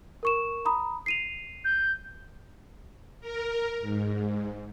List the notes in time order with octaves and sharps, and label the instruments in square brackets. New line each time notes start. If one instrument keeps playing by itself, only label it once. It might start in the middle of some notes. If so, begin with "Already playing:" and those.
[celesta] A#4 C#6 E7
A#5 B5 D#6
C7 D#7 F7
[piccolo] G6
[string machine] A#4
G#2